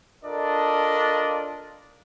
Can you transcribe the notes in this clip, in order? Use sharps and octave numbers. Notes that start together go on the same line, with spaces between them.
D4 F4 A4 A#4 D5 D#5